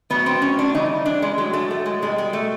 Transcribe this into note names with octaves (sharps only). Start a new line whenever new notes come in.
A2 F#3 B3
C4
C#4
D4
C#3 E3 G3 D#4
D4
G#3
A2 F#3 G#3
A3
A3
G#3
B2 G3 G#3
G#3
A3